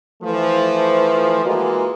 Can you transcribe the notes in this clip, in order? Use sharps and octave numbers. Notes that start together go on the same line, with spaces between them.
E3 F3 A3
E3 G#3 A#3 F4 F#4 D#5